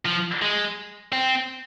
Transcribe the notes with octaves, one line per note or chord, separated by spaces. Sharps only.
F3
G#3
C4